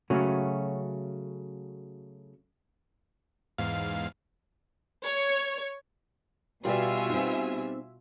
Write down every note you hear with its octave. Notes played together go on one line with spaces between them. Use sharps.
C#3 F#3 A3 C#4 F#4
E2 G#2 F5
C#5
B2 G3 B3 F4 F#4 D5 E5 G#5
C4 D#4